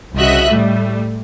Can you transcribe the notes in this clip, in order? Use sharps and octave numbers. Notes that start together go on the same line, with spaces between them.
C2 C#3 F#4 D#5 E5 F#6
A2 G3 A3